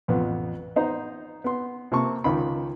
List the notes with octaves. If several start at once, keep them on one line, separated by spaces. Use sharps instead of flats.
A1 F2 B3
B3 D#4 C5 A#5
B3 C6
C3 A#3 A5 C#6
C#2 D#3 B5